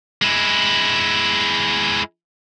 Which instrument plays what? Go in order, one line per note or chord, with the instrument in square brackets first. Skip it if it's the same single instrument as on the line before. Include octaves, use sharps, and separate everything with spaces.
[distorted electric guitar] G#3 E4